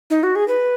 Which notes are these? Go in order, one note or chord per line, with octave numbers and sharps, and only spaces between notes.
D#4
F#4
G#4
B4